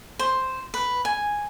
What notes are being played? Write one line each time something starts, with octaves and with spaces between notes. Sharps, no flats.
C5
B4
G#5